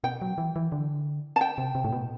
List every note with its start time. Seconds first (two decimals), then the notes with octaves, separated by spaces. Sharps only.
0.04 B2 G5
0.22 F#3
0.38 E3
0.56 E3
0.72 D3
1.36 A5
1.41 G5
1.58 C3
1.75 C3
1.84 A2
1.93 B2